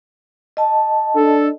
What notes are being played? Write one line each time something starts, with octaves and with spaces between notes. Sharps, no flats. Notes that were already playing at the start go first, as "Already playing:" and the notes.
D#5 A5
D4 A4